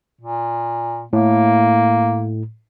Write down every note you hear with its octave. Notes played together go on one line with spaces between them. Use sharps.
A#2
A2 A#3